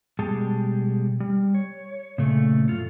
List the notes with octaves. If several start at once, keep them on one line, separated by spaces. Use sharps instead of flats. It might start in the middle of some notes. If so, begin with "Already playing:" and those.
B2 G3 G#3 G4 G#4 A5
G3
C#5
A#2 C#3 A3
F#2 F4 A4